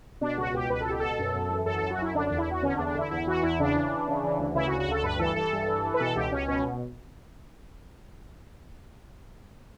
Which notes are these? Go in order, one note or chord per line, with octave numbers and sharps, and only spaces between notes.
B2 D4
C#2 F#4
B2 G4
C#2 B4
A4
B2 G4
B2 A4
F#2
F#2
E3
F#2 A4
F#2 A4
F#4
F#2 E4
D3 D4
E2 D4
E4
E2 F#4
D3 C#4
D4
E2
D4
D3 E4
E2 E4
E3 F#4
E2 E4
C#3 D4
E3
E3
C#3
E3
D2
C#3 E4
F#4
D2
F#4
D2 A4
G2 B4
E3 A4
E3 A4
G2
E3
E3
B4
B2 A4
C#2 G4
C#2 C#4
B2 C#4